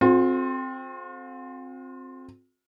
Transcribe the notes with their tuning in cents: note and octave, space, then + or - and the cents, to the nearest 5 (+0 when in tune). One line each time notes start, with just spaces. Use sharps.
C4 +5 F4 +45 A4 -35